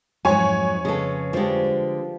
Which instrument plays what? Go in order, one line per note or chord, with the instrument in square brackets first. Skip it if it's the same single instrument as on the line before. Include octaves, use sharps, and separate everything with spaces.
[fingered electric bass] F2 [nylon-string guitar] G#2 F#3 [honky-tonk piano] C#5 G#5
[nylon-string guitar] C#3 A4 [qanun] G#3 B4
[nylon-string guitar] D3 G#3 [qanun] F3 G3